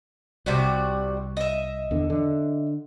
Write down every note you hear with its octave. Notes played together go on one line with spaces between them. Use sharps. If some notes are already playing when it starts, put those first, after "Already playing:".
C2 C3 G3 F#4
D#5 E5
E2 D3
D3